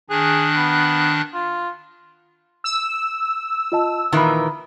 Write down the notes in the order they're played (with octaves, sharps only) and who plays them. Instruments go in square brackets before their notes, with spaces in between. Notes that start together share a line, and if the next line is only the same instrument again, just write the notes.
[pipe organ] D#3 D4 F#6 [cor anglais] G#4
[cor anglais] B3
F4
[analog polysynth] E6
[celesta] F4 D#5 A5
[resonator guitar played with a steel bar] A#2 D#3 E3 [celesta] A#5 B5